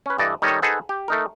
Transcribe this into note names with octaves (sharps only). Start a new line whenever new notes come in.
C#4 B4
G2 E3 A4 D5 D#5
D#3 G3 D#4 A4 C#5 D#5
D#4 G#4 A4 B4 C5 F#5
G4
A3 D#4 A#4